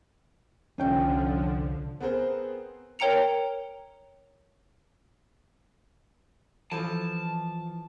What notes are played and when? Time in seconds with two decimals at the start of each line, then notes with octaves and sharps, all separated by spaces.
0.78 F1 C2 D3 F3 C#4 G5
2.00 B3 C4 G#4 A#4 C5
2.99 A#4 C#5 G5 A#5 C#7 F7
6.72 E3 F3 A4 A5